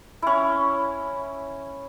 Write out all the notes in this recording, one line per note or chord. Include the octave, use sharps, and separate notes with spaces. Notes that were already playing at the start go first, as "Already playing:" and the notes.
C#4 E4